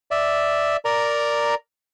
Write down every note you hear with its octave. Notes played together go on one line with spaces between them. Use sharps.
D5 E5
A#4 D5 A#5